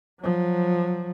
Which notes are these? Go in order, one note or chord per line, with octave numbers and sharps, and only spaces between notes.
F3 F#3